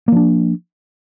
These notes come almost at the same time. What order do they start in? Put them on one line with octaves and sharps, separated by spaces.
A#3 F3 D4